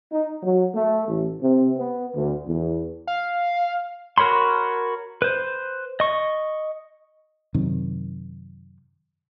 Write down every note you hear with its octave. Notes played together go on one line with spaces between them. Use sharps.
D#4
F#3
A3
A1
C3
B3
D2
E2
F5
F#4 A#4 C#5 B5 C6
B4 C5
D#5 C#6
F#2 C3 D#3